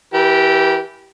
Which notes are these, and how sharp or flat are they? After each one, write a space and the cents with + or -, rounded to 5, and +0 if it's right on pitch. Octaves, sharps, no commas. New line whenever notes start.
E3 +0 G4 -10 A#4 +40